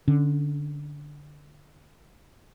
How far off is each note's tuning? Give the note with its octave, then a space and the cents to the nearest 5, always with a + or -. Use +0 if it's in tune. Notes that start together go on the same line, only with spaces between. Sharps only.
D3 +0 C#4 +15